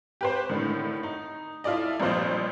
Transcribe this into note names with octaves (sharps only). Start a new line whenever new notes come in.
G4 B4 C5
A2 D3 D#3
D#4
E4 F4 A4 D5 D#5
A1 G2 A#2 F3 C5 D#5